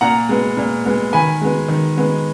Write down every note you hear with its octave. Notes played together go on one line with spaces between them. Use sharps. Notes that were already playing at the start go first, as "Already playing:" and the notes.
A#2 F#5 A#5
G#3 B3
A#2
G#3 B3
D#3 G#5 B5
G#3 B3
D#3
G#3 B3